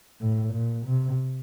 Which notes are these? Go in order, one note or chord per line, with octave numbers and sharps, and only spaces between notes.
A2
A#2
C3